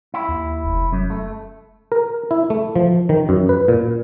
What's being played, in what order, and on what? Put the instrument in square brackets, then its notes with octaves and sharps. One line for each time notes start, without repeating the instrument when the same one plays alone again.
[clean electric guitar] E4
[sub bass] D#2
F1
[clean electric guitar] F#2
A3
[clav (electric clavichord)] A#4
E4
A3
F3
D#3
F#2
B4
A#2